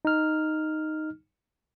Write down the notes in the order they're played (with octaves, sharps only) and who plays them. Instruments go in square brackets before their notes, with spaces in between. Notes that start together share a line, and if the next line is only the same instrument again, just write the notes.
[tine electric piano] D#4 F6